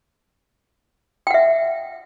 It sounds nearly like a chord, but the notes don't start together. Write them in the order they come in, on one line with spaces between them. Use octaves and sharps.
G5 F#5 E5